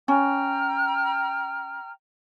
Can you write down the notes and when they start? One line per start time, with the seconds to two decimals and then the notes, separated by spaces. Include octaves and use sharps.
0.08 C#4 G5 A#5 F6